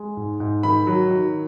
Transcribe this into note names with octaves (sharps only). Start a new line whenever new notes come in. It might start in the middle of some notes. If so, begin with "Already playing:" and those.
Already playing: G#3
G#2
G#2
D#3 B5
F#3
D#3